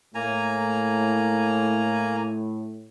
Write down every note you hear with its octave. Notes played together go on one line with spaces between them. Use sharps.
A2 A#3 G#5 A#5